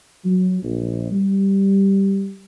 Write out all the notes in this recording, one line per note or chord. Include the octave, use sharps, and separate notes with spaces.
F#3
A#1
G3